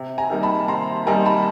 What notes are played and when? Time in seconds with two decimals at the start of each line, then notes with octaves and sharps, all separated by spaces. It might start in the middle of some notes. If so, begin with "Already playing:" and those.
Already playing: C3
0.18 G#5 A#5
0.30 D#3 G3 A#3 D#4
0.43 A5 B5
0.68 C3 A#5 C6
1.06 D#3 G3 A#3 D#4 G#5 A#5
1.25 A5 B5